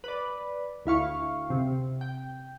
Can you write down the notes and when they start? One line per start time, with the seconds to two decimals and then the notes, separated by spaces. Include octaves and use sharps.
0.04 B4 D5
0.86 D2 E4 F5 C#6
1.50 C3
2.01 G5